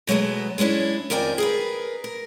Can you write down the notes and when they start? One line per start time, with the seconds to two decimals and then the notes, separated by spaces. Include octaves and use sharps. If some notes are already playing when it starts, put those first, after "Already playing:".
0.07 B2 F#3 G#3 A3 B3
0.58 G#3 B3 C#4 D4 E4
1.10 F2 D#3 A#4 D5 G5 G#5
1.38 G#4 A#4 B4
2.04 A#4